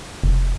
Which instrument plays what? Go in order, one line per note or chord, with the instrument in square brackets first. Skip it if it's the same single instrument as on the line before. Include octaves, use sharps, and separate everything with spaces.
[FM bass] F1